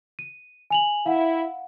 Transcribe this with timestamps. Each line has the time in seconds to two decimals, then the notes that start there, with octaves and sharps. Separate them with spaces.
0.19 D#7
0.70 G#5 F7 F#7
1.06 E4 F5 F#5